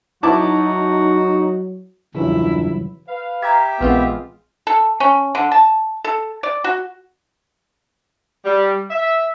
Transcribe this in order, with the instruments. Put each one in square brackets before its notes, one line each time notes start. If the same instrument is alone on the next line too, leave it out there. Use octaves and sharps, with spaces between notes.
[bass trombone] F#3 [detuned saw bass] D#4 [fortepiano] E4 A5 D6 [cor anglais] F#4
[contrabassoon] A#1 [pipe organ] E2 G2 [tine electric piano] C#3 E3 F#3 [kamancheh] E4
[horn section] B4 F5
[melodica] G4 E5 [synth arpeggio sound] A#5 G#6
[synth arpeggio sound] A#1 E3 C4 [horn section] G#3 F4 [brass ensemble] B3
[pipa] A4
C#4
D3
A5
A4
D5
F#4
[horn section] G3
E5